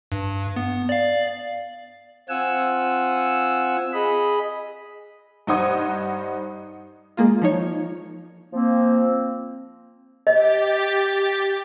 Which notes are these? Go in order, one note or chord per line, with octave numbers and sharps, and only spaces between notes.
G2
B3
D5 F5
C4 F4 F#5 G#5 E6
G#4 D#5 B5
G2 D#4 C5 F#5 D#6 G#6
G#3 A#3 F4
F3 D#4 C#5
F3 A#3 C4
G4 D#5 A6